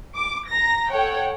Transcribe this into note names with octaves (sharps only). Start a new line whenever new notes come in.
D6
A#5 A#6
A4 C#5 F#5 G5